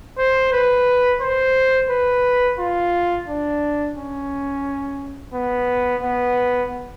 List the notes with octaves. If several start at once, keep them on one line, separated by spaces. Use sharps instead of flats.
C5
B4
C5
B4
F4
D4
C#4
B3
B3